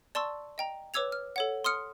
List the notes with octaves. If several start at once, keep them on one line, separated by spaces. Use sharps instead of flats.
D5 A5 C6 C#6 E6
D#5 G5 A#5
B4 C#5 D6 E6 G#6 F7
F6
A4 C#5 F#5
C6 D#6 F6 C#7